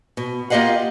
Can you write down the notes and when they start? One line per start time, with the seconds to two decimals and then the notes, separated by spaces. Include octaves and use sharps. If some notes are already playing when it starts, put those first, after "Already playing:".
0.17 B2
0.50 A#3 F4 G4 D#5 F5 F#5